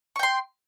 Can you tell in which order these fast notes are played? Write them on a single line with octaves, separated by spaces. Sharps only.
C#6 G5 C6